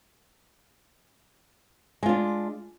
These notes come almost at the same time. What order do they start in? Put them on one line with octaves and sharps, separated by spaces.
G#3 F4 D4